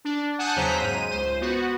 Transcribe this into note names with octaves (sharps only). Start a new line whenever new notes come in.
D4
F#5 G#5 A5 D#6 F#6 G6
E2 C#3 F#3 C5 A#5 B6
G#2 D#7
C#2 C5
B3 F#4